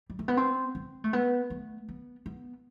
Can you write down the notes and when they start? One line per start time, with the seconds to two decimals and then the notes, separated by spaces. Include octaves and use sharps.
0.10 G3
0.19 A3
0.28 B3
0.37 C4
0.75 C4
1.04 A3
1.13 B3
1.50 A3
1.89 B3
2.26 B3